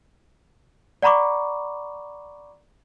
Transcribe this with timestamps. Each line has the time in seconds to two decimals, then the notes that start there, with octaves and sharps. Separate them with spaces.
1.02 D5 F#5 A#5 B5 C#6 D6